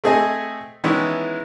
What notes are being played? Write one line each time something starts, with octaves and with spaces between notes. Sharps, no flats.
A3 C4 G#4 A4 D#5 G#5
D#3 E3 G#3 B3 C#4 E4